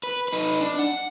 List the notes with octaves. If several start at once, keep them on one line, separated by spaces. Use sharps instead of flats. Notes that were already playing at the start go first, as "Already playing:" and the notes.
B4
D#4 B4
D4
F#5